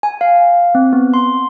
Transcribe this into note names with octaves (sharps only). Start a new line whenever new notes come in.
G#5
F5
C4
B3
C6